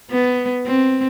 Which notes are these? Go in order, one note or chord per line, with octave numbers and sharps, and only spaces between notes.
B3
C4